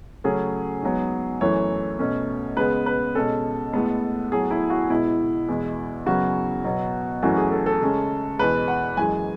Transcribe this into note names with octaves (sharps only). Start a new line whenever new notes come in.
C#3 F#3 A3 C#4 G#4
G#2 F#3 B3
F#2 E3 A3 C#5
B2 A3 C#4
C#3 G#3 B3 B4
B4
B2 G#3 C#4 A4
A2 G#3 B3
A2 F#3 B3 G#4
E4
F#4
B2 G#3 B3 E4
E2 B2 G#3
F#2 C#3 F#3 B3 F#4
B2 F#3 B3
F#2 E3 A3 C#4 F#4
G#4
A4
A4
C#3 G#3 C#4
E2 B2 G#3 B4
F#5
F#2 E3 G#3 G#5